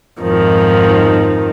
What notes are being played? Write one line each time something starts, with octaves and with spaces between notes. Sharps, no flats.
F2 G#2 D#3 F3 D#4